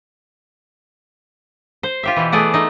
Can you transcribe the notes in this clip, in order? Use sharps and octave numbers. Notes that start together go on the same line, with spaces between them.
C5
F4 G4 E5
B2 E3
A3 B3 G#4 D5 F#5
A3 D#4